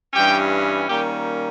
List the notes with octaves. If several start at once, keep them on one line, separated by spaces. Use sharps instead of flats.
G2 E3 G3 C#4 G4 G5
D#3 G3 A#3 C#4 G4 G5